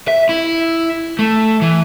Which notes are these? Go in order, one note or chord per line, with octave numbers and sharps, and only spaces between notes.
E5
E4
A3
E3